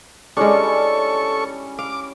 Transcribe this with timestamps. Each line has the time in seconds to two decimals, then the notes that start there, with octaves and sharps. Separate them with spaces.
0.37 G3 G#3 C#4 D4 E4 A4 C#6
1.79 F5 D6